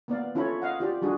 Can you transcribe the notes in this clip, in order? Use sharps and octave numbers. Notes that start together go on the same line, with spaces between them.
A#3 B3 D5 F5
C#4 E4 F4 A4 C#5 B5
D#5 F5 F#5
F4 G4 D5
G3 D4 F#4 G#4